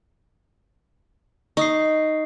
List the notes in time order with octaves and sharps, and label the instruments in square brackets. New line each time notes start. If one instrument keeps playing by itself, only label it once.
[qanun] D#4 [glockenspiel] C#6 D#6 C7